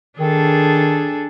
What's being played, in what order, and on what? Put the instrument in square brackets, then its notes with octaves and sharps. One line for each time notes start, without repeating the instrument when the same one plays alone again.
[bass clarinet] D#3 [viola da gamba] D4 G#4 A4